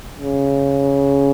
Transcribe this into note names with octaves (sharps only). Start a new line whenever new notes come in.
C#3